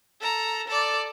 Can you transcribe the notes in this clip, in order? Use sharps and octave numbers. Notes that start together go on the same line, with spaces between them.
A4 A#5
A4 D5